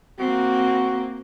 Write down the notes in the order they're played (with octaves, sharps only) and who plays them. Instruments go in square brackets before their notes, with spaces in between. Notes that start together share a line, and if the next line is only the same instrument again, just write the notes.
[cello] A#3 C4 [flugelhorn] F#4